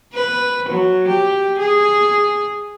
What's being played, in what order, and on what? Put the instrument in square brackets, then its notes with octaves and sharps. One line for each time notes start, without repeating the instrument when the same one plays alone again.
[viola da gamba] B4
F#3
G4
G#4